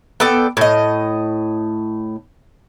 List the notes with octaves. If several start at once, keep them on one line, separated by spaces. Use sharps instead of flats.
B3 A4 D5 G5
A2 D#5